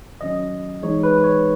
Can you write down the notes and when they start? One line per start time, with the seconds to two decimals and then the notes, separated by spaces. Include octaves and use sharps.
0.21 D#3 F#3 C#4 D#5
0.82 E3 G#3 D#4 C#5
1.03 B4
1.24 C#5